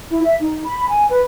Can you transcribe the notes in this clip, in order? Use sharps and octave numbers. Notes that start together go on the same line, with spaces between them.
E4
E5
D#4
B5
G#5
B4